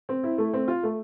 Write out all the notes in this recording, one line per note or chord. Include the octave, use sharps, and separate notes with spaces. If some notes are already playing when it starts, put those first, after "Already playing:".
C4
E4
A3
C4
F4
A3